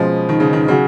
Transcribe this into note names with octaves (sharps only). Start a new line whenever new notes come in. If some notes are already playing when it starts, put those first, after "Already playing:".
Already playing: B2 F3 G#3 C#4
D#3
C#3
D#3
C#3 F#3 C#4 F#4